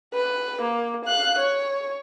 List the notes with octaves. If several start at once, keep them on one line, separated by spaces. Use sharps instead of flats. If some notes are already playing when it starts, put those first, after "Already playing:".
B4
A#3
F5 F#6
C#5